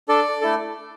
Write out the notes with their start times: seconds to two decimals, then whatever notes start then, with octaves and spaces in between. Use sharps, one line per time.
0.09 D4 A4 D5
0.41 A3 E4 A4